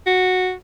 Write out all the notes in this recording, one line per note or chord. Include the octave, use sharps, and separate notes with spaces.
F#4